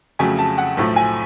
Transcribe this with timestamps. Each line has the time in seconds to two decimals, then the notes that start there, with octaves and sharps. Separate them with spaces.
0.19 F2 C#3 F#3 A3 G#5
0.38 A5
0.58 F#5
0.77 B1 A2 F3 A3
0.96 G#5